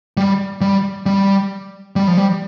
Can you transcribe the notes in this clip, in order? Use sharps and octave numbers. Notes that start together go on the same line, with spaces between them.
G3
G3
G3
G3
F3
G3